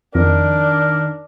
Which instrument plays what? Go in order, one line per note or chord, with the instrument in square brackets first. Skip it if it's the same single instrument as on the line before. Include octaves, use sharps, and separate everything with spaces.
[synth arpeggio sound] F2 [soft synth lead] D#3 [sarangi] D4 [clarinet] A#4